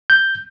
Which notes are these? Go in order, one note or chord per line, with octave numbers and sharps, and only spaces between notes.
G6